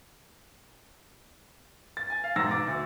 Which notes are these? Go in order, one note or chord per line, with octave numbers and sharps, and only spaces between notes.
A6
G#5
F5
E1 G#2 E6 A6 A#6
D6
D2